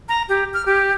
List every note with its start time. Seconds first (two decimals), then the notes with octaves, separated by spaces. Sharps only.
0.09 A#5
0.29 G4
0.54 F6
0.66 G4